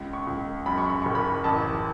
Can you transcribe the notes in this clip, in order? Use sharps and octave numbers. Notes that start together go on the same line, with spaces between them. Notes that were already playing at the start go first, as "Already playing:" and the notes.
Already playing: C#2
C#6
C#2
F#2 B5
C#6
B5
F#1 C#6
B5
A1 A5